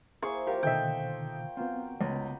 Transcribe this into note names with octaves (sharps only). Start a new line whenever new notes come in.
A#3 E4 G#4 C5 C#6
F3 F4 G4 A#4
B2 D3 D#3 A3 D#4 E5 G5
F#3 B3 C4 F4
C#2 C#3 B3 A#5 B5